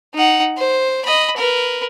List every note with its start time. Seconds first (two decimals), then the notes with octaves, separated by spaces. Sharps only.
0.14 D#4 F#5
0.57 C5
1.05 D#5 B5
1.36 A#4 B4